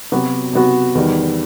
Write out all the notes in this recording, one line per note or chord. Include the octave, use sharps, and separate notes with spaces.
C3 F#3 B3 F#4
C3 F#3 B3 F#4
E2 D#3 G3